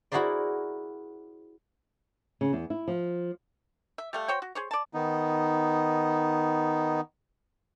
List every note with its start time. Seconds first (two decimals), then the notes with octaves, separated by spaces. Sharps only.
0.12 E4 F#4 G#4 A#4 C5 D5
2.41 C#3
2.53 E2
2.70 E4
2.88 F3
3.98 E5
4.13 G3 A3 F5
4.28 F#4 C5 C#5 G5
4.42 F#4
4.55 G#4 C5 C#5
4.71 D5 A5
4.93 D#3 B3 D#4